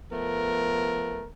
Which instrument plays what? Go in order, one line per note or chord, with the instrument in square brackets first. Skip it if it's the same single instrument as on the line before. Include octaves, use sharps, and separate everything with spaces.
[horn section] F3 A3 B3 A#4